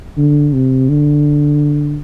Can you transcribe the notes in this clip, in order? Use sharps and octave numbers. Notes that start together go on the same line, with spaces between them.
D3
C3
D3